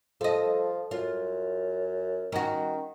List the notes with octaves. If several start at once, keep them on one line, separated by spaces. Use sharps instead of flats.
F3 A4 D#5
F#2 F4
D#3 C#4 F#4